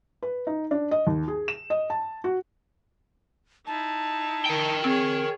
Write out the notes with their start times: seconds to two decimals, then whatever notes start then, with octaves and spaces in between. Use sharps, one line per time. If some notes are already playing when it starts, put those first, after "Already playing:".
0.23 B4
0.47 D#4
0.71 D4
0.91 D#5
1.07 D#2
1.28 G#4
1.48 E7
1.70 D#5
1.90 A5
2.24 F#4
3.67 D#4 E4 A5
4.46 A#4 G5
4.84 C4 G#4 C#5